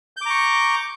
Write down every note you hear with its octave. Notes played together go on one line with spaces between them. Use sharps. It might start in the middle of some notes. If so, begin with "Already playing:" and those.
A#5 C#6 D6 G6